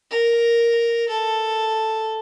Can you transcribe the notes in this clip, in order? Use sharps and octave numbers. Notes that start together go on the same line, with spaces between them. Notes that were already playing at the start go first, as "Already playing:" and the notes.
A#4
A4